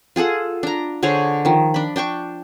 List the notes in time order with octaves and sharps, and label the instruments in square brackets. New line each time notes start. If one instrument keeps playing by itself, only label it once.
[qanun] F4 G#4 A4 F#5
D4 A#5
D3 G#4 C5 C#5
D#3 F3
D4 B5
D4 G5 A5 C#6